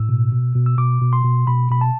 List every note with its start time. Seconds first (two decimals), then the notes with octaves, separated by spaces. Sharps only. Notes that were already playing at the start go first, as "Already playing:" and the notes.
Already playing: A2 E6
0.09 B2
0.32 B2
0.55 B2
0.66 E6
0.78 B2 D6
1.01 B2
1.13 C6
1.24 B2
1.47 B2 B5
1.70 B2 B5
1.81 A5